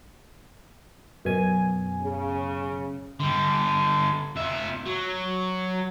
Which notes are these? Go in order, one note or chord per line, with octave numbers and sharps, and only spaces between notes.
F#2 B2 G#5
C#3
D3 G3
F2 E5
F#3